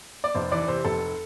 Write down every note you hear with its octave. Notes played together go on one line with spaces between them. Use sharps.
D5
F1 C5
E3 D5
C3 C5
F1 A4